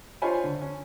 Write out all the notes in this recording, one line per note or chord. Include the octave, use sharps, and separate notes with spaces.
D4 F4 C5 C#5 G#5 B5
D3
C#4